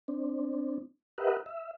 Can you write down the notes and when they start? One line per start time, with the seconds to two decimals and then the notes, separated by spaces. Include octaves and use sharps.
0.08 C4 D4
1.18 G4 A#4 B4 D#5 E5 F#5
1.46 E5